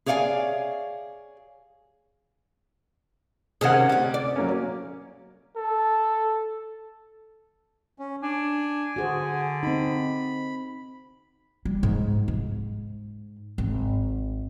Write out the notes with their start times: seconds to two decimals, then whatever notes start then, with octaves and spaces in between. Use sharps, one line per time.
0.06 G#4 C#5 D5 F5 F#5 G#5
3.61 C3 D#3 C#4 G#4 F#5
3.89 D2 G3
4.14 D5
4.36 F#3 A#3 C#4
5.56 A4
7.99 C#4
8.22 D4 G#5
8.96 D3 F#4 G#4 C5
9.63 C4 D#4 B5
11.65 G3
11.83 G#2
12.28 G#2
13.58 G#1